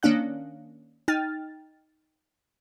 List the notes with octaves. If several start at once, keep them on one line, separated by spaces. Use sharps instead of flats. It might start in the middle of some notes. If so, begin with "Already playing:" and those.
D#3 A#3 C#4 D4 F5 F#6
D#4 G5 F6 A6